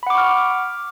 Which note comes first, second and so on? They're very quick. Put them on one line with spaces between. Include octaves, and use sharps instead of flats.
B5 F#5 D6 C#6 F6